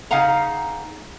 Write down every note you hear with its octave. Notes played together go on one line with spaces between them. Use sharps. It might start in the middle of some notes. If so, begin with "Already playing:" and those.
C#3 D#4 F5 F#5 A#5